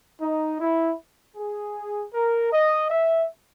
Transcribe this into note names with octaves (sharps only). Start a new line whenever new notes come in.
D#4
E4
G#4
A#4
D#5
E5